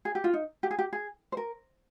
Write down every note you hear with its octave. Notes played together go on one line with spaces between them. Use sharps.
G#4
G4
F4
D#4
G4
G#4
G4
G#4
C5
A#4